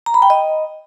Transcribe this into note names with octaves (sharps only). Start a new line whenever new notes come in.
A#5
B5
G5
D#5